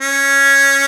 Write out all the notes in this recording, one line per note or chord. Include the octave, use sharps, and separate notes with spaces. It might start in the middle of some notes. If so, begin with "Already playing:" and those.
C#4